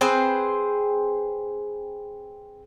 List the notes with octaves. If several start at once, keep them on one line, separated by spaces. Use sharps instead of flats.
C4 G#4 B4 C5